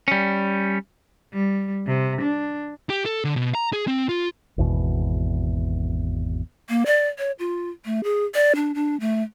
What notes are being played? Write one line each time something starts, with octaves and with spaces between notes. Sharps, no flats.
G3 C#4
G3
C3
D4
G4
A4
D3
B2
A#5
G#4
C4
F4
G#1 E2 B2
A#3
D5
C#5
F4
A3
G#4
D5
D4
D4
A3